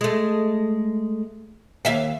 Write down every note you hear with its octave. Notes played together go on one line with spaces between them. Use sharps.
G#3 A3
D#2 E5 F5